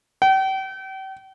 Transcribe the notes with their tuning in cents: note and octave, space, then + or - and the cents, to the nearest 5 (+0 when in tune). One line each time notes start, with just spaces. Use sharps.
G5 -40